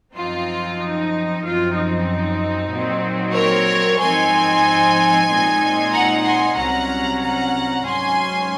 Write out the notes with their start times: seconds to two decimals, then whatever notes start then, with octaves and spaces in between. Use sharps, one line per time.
0.14 F#2 F3 C4 D#4 F4
0.78 D#4
1.43 F#2 F3 C4 F4
1.75 D#4
2.71 A#2 F#3 C4
3.35 A#4 C#5
3.99 G#2 F3 C4 D#4 G#5 C6
5.28 A#2 G#3 C4 D#4
5.92 F#5 A#5
6.24 G#5 C6
6.56 C2 C3 F#3 C#4 F#5 A#5
7.21 F#5 A#5
7.84 G#2 F#3 C#4 G#5 C6